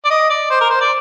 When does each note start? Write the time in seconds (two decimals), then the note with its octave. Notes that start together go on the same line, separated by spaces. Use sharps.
0.05 D5
0.10 D#5
0.30 D5
0.50 C5
0.61 A#4
0.70 C5
0.81 D5